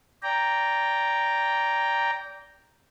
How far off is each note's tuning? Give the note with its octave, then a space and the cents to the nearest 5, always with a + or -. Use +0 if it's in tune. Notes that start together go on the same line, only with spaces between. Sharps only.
D5 -25 G5 +0 A#5 +0